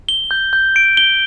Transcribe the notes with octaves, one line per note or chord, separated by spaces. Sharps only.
G7
G6
G6
D7
G7